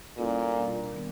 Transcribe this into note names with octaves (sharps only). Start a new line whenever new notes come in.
A#2 G3 A#3 C#4 E4 A4
B2 G3 A#3 D4
D#3 G3 B3